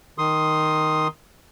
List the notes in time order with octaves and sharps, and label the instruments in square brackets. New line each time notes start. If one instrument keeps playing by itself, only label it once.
[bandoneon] D#3 C6 D#6